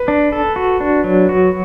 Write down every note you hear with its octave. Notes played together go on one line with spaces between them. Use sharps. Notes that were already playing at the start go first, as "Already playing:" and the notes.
Already playing: B4
D4
A4
F#4
D4
F#3
F#4